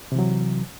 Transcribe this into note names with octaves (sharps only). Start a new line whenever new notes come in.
C3 E3 F#3